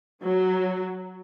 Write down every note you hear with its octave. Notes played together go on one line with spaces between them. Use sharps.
F#3